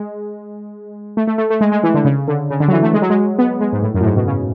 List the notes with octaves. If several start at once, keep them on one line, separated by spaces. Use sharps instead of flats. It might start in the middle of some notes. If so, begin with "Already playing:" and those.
Already playing: G#3
A3
A3
A3
A3
G#3
G#3
E3
D3
C#3
D3
C#3
D3
F#3
E3
A3
G#3
F#3
G#3
B3
G#3
G#2
A2
F#2
A2
G#2
B2
C#3